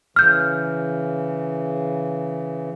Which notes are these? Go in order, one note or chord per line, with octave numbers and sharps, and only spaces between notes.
C#3 E3 F6 G6